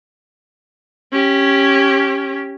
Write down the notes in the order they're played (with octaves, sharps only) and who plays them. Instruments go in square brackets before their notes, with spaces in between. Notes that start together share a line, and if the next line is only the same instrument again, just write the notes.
[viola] C#4 G4